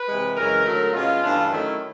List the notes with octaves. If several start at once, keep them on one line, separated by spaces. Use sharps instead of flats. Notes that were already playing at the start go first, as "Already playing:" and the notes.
Already playing: B4
C3 E3 G#3
F#2 C#3 E3 G#3 A#4
D3 F#3 A3
B2 G#3 C#4 F4
G2 E3 A3 D4
D#3 F#3 A3 C#4 E4